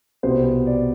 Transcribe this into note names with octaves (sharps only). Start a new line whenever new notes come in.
C2 B2 G3 B3 C5
D5